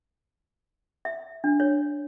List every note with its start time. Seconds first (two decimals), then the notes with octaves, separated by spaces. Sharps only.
1.05 E5
1.44 D4
1.60 C#5